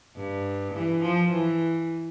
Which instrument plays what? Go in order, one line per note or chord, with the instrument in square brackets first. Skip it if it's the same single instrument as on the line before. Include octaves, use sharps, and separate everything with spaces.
[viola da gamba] G2
E3
F3
E3